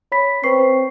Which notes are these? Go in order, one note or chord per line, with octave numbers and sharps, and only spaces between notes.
C#5 B5 B6
C4 B4 C#6 C7